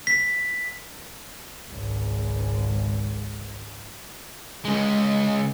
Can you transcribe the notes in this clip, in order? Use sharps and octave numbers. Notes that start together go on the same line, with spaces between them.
B6
G#1 C#2
C#2 G#3